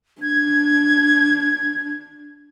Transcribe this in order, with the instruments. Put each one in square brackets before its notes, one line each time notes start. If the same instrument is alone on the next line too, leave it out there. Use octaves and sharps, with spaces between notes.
[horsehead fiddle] D4 [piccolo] G#6